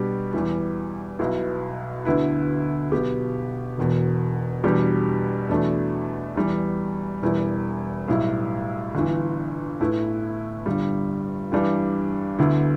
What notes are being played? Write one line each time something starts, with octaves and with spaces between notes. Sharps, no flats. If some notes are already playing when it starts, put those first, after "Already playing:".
Already playing: B2 G3 B3 D4 G4
E2 E3 G3
B1 B2 B3 E4
D2 D3 B3 E4 B4
B1 B2 B3 G4
E1 E2 B2
E2 B2 G3 D4 G4
E2 B2 A3 D4
E2 E3 G3
E1 E2 E3 G3 E4
B1 A2 G3 E4
G1 G2 E3
A2 A3 E4 B4
G1 G2 G3
G2 E3 G3 D4
D2 D3 B3 E4